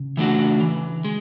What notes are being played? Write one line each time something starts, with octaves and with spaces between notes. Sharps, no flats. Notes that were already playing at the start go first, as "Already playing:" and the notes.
Already playing: C#3
E3 A3 D4 F#4
E3
G#3